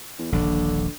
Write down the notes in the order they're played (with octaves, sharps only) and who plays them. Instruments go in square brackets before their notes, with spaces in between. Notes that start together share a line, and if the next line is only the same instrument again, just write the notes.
[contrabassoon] E2
[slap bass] D#1 A#1 [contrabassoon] D3